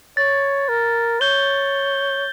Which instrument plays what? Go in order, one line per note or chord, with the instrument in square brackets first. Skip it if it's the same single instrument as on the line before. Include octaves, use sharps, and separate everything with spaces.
[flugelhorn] C#5 [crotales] A6
[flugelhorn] A#4
[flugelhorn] C#5 [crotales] G6 G7